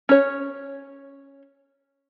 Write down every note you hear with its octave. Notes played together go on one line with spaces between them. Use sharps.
C#4 C#5